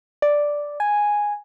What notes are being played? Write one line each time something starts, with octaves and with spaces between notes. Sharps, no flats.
D5
G#5